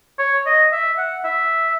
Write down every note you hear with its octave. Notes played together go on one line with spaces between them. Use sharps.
C#5
D#5
E5
F#5
E5